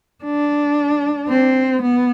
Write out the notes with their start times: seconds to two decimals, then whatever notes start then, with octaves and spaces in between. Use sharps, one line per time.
0.24 D4
1.29 C4
1.82 B3